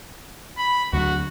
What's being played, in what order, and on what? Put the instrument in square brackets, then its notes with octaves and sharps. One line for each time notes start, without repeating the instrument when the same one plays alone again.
[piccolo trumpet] B5
[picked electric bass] D2 D3 F#3 [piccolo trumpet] F#4